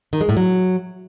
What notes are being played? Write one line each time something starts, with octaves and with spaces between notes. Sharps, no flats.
D#3
G#3
A2
F#3